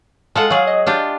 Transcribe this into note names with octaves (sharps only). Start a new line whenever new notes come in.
G#3 F4 A4 F#5
F#3 G#4 F5
D#5
D4 F4 G4